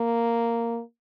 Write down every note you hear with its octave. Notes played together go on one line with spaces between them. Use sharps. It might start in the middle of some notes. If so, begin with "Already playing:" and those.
Already playing: A#3